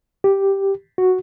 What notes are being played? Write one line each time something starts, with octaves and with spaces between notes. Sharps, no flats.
G4
F#4